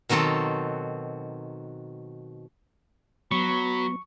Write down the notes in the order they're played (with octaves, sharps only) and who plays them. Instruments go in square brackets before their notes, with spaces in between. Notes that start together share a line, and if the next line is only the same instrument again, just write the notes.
[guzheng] B2 D#3 F#3 C4 A4
[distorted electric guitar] F#3 [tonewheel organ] B3 [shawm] B5 [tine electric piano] C#6